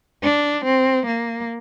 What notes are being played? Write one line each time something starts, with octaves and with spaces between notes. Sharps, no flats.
D4
C4
A#3